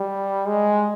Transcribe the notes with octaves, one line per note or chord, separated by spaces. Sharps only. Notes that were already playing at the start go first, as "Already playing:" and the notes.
Already playing: G3
G#3